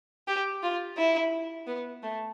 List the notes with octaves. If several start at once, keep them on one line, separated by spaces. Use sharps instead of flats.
G4
F4
E4
B3
A3